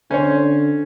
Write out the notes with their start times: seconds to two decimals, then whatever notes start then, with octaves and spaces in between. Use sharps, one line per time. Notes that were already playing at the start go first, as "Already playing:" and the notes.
0.11 D3 C#4 C5 C#5